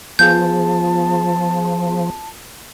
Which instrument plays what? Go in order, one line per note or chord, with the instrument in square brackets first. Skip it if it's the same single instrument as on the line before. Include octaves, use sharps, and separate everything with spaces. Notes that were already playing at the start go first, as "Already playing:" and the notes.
[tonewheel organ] F3 [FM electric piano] B3 F4 G#4 [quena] A5 [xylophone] G6